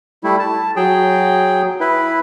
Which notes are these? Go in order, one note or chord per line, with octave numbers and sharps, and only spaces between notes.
G3 A3 E4
A5
F#3 G#4 G5
E4 B4